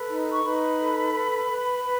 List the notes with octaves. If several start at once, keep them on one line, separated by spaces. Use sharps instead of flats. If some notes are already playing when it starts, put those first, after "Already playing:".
Already playing: A4 B4 B5
D#4
C#6
D#4 B4 B5
A4
B4
B4
B4